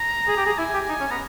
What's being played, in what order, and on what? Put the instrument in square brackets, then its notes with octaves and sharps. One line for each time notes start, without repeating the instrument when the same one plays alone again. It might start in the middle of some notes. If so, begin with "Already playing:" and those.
Already playing: [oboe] A#5
[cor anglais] G#4
G4
G#4
[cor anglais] E4 [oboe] G#5
[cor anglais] G4
D#4
C#4
[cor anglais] B3 [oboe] A#5